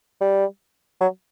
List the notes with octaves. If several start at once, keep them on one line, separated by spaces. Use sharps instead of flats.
G3
F#3